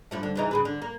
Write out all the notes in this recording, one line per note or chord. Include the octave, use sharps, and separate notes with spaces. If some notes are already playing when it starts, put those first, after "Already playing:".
G2 F3 A3
D3
C#3 E3 D#4
C#3 G#4 B4
D3
A#3